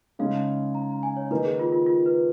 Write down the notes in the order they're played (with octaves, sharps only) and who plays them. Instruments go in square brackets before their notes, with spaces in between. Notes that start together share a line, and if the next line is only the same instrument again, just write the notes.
[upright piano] C#3 G#3 D#4 [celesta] F5
[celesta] A#5
A#5
G#5
C#5
[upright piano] D#3 A#3 D#4 [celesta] B4
[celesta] G#4
F4
F4
F4
B4